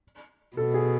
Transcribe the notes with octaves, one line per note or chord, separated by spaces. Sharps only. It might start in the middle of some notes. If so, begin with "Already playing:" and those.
B2 A4
G#4